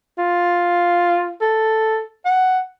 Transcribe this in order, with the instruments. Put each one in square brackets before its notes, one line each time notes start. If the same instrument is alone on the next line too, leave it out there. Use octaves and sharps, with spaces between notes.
[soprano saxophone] F4
A4
F#5